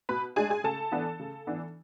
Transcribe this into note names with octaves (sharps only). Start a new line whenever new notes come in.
B2 B4 B5
G#3 D4 G#4 G#5
G#4 G#5
C#3 A4 A5
E3 B3 D4
C#3
E3 B3 D4